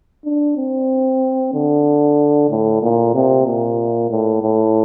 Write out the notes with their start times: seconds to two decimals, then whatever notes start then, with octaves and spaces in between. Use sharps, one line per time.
0.25 D4
0.57 C4
1.54 D3
2.50 A2
2.82 A#2
3.14 C3
3.46 A#2
4.10 A2
4.42 A2